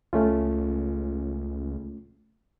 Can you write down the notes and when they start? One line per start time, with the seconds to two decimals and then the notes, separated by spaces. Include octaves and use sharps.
0.13 C#2 A3 C#4 F4